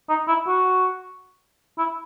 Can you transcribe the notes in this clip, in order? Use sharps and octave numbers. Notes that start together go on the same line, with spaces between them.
D#4
E4
F#4
E4